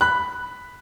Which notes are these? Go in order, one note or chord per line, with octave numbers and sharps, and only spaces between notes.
B5 F#6